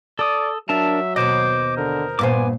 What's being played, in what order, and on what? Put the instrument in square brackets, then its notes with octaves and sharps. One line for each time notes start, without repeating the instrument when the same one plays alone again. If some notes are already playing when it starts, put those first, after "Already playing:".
[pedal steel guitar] A4 D#6 [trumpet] D5
[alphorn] F#3 [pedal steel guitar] D4 A#4 A5 [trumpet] E5
[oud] D#2 B2 [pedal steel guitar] C5 D#5 [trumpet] D6
[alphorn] D3 [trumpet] A#4
[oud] G2 A#2 C5 [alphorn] B3 [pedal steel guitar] G#5 D6